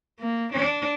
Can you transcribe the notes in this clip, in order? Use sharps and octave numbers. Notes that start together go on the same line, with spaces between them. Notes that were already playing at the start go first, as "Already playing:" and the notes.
A#3
D4